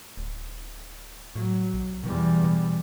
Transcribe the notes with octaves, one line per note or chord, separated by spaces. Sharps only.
D1
A2 F#3
B1
E2 B2 G3
B2